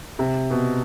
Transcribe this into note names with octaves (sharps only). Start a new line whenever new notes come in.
C3
B2